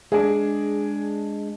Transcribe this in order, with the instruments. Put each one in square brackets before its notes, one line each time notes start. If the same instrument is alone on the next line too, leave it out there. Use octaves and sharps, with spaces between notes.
[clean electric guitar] G#3 D4 [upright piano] G#4